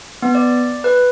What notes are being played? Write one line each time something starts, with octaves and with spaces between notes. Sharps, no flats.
B3
D5
B4